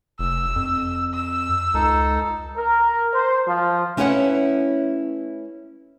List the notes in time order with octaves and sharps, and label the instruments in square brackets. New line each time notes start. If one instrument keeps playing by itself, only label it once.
[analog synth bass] F1 [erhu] E6
[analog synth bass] F2
[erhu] E6
[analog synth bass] C#2 [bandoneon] D#4 A4
[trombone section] A#4
C5
F3
[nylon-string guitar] A3 C#4 E4 B4 C#5 F#5